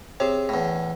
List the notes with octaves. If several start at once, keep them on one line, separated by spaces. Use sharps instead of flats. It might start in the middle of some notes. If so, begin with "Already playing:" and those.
C3 G#4 C#5
E2 A2